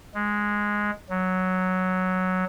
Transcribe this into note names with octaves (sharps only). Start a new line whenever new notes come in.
G#3
F#3